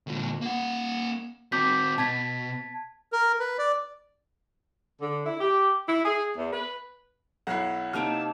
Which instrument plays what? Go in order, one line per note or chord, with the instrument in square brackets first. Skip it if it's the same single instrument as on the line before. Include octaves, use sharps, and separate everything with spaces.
[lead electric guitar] D2 A#2
A#3 F#5
[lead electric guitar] C4 F#4 [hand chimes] D6 G6 B6
[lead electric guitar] B2 [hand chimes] A5 G#6 B6
[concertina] A#4
B4
D5
[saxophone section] D3
E4
G4
E4
G#4
E2
B4
[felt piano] B1 C7 [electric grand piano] E4 C#5 F#5
[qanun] C3 A#3 D#4 [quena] A5 [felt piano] F6 D7